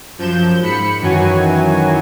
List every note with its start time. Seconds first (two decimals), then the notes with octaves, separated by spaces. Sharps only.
0.18 F#2 F3 G6 E7
0.61 G#2 B5 C#7
1.01 F#2 D#3 E3 F#3 F#4 G#5